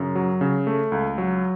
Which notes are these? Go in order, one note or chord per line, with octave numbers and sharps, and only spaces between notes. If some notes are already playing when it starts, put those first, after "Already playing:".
Already playing: F#2 C#3
F#3
C#3
A3
C#2
F#3